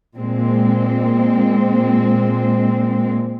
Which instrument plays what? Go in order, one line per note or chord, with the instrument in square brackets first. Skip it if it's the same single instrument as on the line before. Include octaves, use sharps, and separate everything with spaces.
[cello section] A#2 G#3 C4